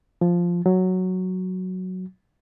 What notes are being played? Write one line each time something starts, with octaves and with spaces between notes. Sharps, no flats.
F3
F#3